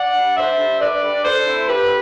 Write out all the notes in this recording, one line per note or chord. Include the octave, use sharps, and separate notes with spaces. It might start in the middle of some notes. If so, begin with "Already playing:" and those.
Already playing: D5 F#5
G3 D4
D3 C5 E5
G3 D4
D3 B4 D5
G3 D4
D3 A4 C5
A3 C4 E4
D3 G4 B4